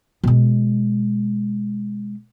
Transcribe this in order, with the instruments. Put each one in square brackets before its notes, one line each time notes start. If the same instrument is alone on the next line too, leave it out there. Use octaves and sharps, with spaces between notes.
[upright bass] B2 G#3